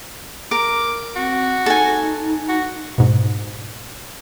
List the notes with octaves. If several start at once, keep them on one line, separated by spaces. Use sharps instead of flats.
A#4 D6
C4 F#4
D#4 A4 G#5
F#4
G#2 B2